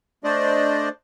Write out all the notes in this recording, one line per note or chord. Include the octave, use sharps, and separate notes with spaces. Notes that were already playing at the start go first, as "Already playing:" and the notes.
A3 D4 C5 D5 D#5